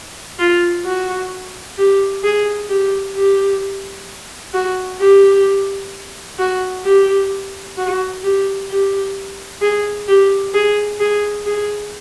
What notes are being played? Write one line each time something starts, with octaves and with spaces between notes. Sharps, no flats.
F4
F#4
G4
G#4
G4
G4
F#4
G4
F#4
G4
F#4
G4
G4
G#4
G4
G#4
G#4
G#4